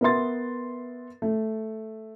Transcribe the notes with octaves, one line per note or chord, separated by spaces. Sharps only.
B3 A#4 B4 E5 C6 A6
A3